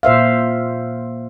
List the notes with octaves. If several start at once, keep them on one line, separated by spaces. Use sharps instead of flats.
A#2 C5 E5 F5